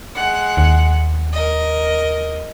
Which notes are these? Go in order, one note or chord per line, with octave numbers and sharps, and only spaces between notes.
G#3 F#5
D#2
A#4 D#5